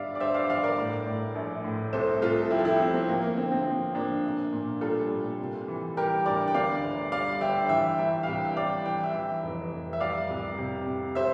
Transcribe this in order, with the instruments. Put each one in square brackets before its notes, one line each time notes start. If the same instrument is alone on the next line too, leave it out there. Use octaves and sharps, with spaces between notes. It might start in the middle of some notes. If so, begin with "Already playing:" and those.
Already playing: [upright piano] G1 G2 D5 E5 F5
D5
G2 C5 E5
D5 F5
G1 D5 F5
A#4 D5
A2
A2
A#1
A2
C2 A4 C5
C2 F4 A4
A4
F3 E4 G4
A4
E4 G4
F3 C4
C4
F3 A#3
A#3
D3 C4
C4
F3 C4
F3 A#3 D4
A#1
A#2
G3 F4 A4
A#2
C3
E3
G3 G4 A#4
D2 A#4 D5
G5
D3 D5 F5
G1
G3 D5 F5
G1 E5 G5
E3 E5 G5
G3 E5 G5
F5
C2 E5 G5
G5
G3 D5 F5
E3 G5
E5 G5
E3
F1
F1
E5
G3 D5 F5
C2
C3
C3
G3 C5 E5